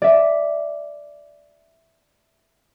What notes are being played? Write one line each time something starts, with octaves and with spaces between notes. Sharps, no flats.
D5 E5